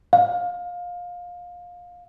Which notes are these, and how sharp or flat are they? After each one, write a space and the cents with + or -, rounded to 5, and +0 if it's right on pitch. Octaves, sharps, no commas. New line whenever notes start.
F5 +20